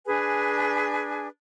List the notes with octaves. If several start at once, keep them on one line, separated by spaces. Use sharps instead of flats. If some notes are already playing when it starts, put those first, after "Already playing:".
D4 G#4 B4 G#5